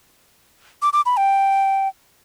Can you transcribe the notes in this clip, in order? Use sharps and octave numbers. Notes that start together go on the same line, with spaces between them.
D6
D6
B5
G5